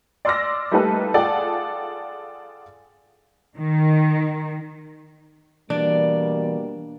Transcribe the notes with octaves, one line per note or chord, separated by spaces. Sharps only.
D5 C6 D6 E6 F6 A#6
G3 A3 A#3 D#4 A4 B4
F4 G#4 A4 D5 F#5 G5
D#3
B2 E3 G3 A#3 D4 D5